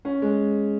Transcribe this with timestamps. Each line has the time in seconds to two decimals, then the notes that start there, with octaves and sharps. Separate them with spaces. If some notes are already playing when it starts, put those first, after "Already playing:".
0.05 C#4
0.22 G#3